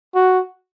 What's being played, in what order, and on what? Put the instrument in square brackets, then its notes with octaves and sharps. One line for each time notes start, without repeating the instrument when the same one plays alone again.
[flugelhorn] F#4